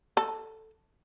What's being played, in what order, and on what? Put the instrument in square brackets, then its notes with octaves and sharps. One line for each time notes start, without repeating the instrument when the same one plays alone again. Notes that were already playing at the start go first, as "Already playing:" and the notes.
[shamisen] A4